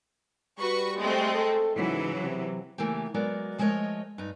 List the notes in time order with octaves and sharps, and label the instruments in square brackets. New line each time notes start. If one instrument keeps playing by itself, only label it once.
[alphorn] G3 [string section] F#4 B4 C#6
[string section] G#3 A3 C4
[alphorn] A4
[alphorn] G#2 [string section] C#3 E3 F#3
[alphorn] C3
[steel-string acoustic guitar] C#3 E3 A3 A#3 G4
F#3 G#3 B3 F#4 A#4 D5
F3 G#3 A3 A#4 C#5 D#5
G2 D#4